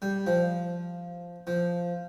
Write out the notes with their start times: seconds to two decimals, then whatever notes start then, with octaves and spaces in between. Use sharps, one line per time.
0.02 G3
0.27 F3
1.47 F3